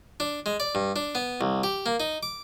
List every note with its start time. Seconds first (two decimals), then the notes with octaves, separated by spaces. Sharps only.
0.20 D4
0.46 G#3
0.60 D5
0.75 G2
0.96 D4
1.15 B3
1.41 C2
1.64 G4
1.86 A#3
2.00 D#4
2.23 D6